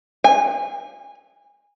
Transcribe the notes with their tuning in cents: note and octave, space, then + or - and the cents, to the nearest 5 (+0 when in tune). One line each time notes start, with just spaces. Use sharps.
G#5 -20